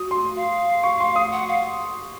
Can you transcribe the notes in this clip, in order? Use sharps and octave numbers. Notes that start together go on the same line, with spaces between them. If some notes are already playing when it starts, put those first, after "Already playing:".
Already playing: F#4 D#6
C6
F5
C#6
C6
D#6
F#5
F5